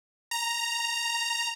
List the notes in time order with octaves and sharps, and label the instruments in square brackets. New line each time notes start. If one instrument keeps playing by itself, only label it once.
[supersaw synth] A#5